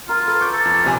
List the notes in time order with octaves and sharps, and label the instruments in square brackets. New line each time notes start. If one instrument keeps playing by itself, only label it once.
[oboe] F4 [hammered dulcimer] A#4
[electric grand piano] A4 [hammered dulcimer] B4
[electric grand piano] C#6 D6 G6
[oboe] A4
[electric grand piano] F2 [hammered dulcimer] F4
[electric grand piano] A#1 C3 G#5